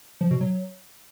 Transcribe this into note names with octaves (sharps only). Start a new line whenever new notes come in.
F3
B2
F#3